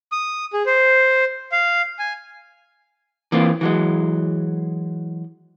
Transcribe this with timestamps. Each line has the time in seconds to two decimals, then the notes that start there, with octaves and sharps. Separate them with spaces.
0.12 D#6
0.53 G#4
0.66 C5
1.52 F5
1.99 G#5
3.32 E3 A#3 C4 F4
3.61 E3 F#3 G#3